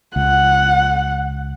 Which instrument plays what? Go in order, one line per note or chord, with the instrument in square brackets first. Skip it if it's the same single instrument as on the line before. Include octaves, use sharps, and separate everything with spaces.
[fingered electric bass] C#2 [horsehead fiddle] F#5